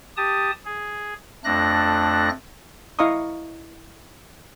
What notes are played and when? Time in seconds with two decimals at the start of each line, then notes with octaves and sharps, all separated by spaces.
0.17 G4 A5 D#6
0.65 G#4
1.44 F2 A3 D4 F#6 A#6
2.99 E4 D#5 F5 A#5 C#6 D#6